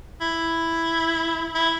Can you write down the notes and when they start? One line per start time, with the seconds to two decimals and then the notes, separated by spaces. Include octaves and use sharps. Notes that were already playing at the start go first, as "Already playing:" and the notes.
0.21 E4
1.55 E4